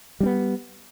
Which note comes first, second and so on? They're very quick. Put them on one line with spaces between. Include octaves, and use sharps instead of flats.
G3 D4 B3